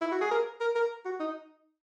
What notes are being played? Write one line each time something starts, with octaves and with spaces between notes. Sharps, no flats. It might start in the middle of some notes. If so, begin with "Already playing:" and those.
E4
F#4
G#4
A#4
A#4
A#4
F#4
D#4